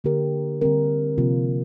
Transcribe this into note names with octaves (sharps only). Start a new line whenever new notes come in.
D3 A#3 G4 A#4
D3 G3 C4 A#4
C3 F3 A#3 F4